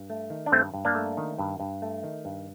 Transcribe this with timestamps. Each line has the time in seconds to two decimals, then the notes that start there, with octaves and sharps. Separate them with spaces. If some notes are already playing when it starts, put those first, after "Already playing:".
Already playing: G2
0.10 A3
0.30 D#3
0.46 D4
0.52 G2 A3 C4
0.74 G2
0.85 A#3 D4
0.95 A3
1.17 D#3
1.38 G2
1.60 G2
1.82 A3
2.03 D#3
2.25 G2